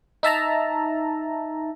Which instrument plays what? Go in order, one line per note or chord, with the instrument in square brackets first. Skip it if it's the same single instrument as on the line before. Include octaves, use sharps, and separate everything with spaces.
[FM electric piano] D#4 E5 A5 A#5